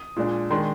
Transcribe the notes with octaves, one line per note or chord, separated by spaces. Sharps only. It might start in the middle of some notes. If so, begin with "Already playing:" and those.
Already playing: D#6
A#2 G#3 D4
D#3 G#3 D4 C6